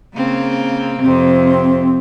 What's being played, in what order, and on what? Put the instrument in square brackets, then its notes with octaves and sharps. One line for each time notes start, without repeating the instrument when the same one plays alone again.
[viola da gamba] C#3 A#3 C4
[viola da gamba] F2 C3 [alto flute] C4